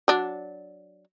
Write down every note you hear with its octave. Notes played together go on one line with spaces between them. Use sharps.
F#3 D4